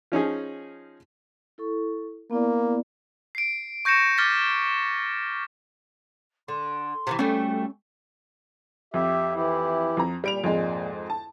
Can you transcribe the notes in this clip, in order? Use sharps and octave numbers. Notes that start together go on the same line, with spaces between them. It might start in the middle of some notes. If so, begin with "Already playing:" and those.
F3 C#4 D#4 G#4
E4 A4 C#6
A#3 B3 E4 D5
C7 D7
C#6 G6 A#6 C#7 E7
D6 F6 A6 B6
D3 C6
C3 D#3 E3
G3 A3 C#4 G5
F#4
F2 G4 E5
E3 E4 G4
F2 A#5
A#2 G3 D7 F7
F2 G#2 G#3
A5